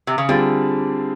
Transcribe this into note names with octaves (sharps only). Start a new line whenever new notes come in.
C3
C#3
D3 G3 C4 F4 G#4